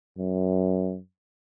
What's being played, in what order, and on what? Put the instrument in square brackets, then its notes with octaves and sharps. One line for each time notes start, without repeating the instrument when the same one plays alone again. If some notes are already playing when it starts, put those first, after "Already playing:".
[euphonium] F#2